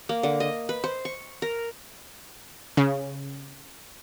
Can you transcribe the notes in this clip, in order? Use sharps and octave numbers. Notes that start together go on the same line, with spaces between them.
A#3
D3
D#5
B4
C5
C#6
A#4
C#3